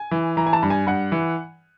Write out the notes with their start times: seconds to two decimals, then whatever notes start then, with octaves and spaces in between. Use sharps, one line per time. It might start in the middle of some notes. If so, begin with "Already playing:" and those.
Already playing: G#5
0.11 E3
0.37 E3 A#5
0.47 G#5
0.53 A5
0.62 G2
0.70 G#5
0.87 G2 F#5
1.12 E3